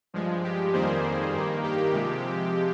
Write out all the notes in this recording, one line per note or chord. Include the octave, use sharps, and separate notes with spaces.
G2 F3 G#3
G4
F2 D#3 G3 A#3 G#4 C5
G2 D#3 A#3
G4
C3 F3 G#3